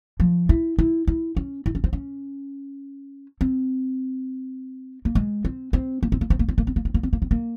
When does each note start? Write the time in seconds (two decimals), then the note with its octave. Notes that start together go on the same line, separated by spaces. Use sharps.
0.20 F3
0.49 E4
0.79 E4
1.07 E4
1.37 C#4
1.66 E4
1.75 C#4
1.84 C4
1.93 C#4
3.41 C4
5.05 A#3
5.15 G#3
5.45 C4
5.73 C4
6.03 A#3
6.12 C4
6.21 A#3
6.30 C4
6.39 A#3
6.49 C4
6.58 A#3
6.67 C4
6.76 A#3
6.85 C4
6.94 A#3
7.03 C4
7.13 A#3
7.22 C4
7.31 A#3